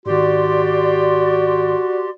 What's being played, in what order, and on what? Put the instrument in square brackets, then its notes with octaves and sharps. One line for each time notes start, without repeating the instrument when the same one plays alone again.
[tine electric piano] G#2 D#3 [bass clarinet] F#4 [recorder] G4 [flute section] D5 C6